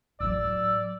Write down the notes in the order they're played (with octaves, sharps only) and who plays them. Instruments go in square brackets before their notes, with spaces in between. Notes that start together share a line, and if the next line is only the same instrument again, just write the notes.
[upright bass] A2 F#3 [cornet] D5 [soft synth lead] E6